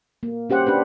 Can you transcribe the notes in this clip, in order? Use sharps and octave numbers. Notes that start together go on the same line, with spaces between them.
A#3
C#4 G4 C5 F#5
D4 G4 B4